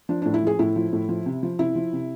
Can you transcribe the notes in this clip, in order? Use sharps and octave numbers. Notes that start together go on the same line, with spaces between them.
F3 D4
A2 D4
E4
F3 G#4
A2 E4
F3
A2
F3
C3
F3
C3 E4
F3
C3